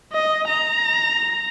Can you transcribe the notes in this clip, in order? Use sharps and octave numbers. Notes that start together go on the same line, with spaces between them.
D#5
A#5